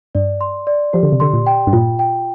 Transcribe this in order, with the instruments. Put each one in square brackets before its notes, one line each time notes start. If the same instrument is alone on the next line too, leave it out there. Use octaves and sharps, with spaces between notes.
[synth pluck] G2 [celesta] D5
[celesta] C6
D5
[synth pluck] F3 [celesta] G4
[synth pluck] D3
C3
[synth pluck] D3 [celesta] C6
[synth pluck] A#2
[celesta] G5
[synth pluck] G2
[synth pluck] A#2 [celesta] F4
[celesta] G5